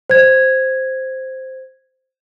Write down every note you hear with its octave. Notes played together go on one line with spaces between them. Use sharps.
C5 G#6